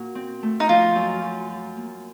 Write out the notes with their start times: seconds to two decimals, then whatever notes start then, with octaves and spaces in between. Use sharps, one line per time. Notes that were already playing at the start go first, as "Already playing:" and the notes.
Already playing: A#2 F#4
0.15 C4
0.43 A3
0.60 D#4
0.69 F3 F4
0.95 F#2
1.22 F#2
1.50 F#2
1.77 A#3